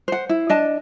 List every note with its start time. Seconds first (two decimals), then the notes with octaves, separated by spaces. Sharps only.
0.08 C5 F#5
0.29 E4
0.49 D4 D#5 A5